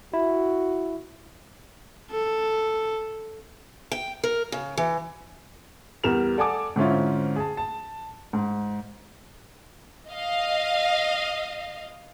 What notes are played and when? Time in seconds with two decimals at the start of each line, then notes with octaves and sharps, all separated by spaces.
0.14 E4 F#4
2.11 A4
3.92 G5
4.24 A#4
4.52 C#3
4.78 E3
6.04 E2 G3 A#4 E7 F7
6.37 A4 D5 F#5 G#5 A5 D6
6.76 G#2 D3 C4 C#4 E4 F4
7.36 G#4 A5
7.57 A5
8.33 G#2
10.09 D#5 F5